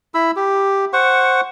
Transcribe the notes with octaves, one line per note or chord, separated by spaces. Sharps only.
E4 B5 E6
G4
C5 F#5 C#6